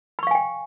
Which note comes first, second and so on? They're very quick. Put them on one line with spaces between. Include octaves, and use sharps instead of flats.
B5 C#6 F5 G#5 G5